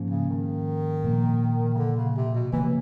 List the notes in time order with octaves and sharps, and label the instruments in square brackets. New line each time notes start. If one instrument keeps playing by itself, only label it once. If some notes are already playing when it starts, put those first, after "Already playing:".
Already playing: [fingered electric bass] G#2 F3 A#3 C#4
[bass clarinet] C#3
D#3
[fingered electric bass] A#2 F3 A#3
[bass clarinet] C#3
D3
C#3
C3
B2
[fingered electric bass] C#3 F3 A#3 [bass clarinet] E3